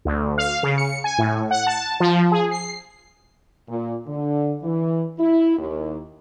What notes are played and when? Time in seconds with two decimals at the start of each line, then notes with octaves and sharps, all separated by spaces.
0.05 D2
0.38 F5
0.63 C#3
0.78 C#7
1.04 G#5
1.18 A2
1.51 F#5
1.67 A5
2.00 F3
2.32 G#4
2.51 C7
3.69 A#2
4.06 D3
4.62 E3
5.19 E4
5.58 D#2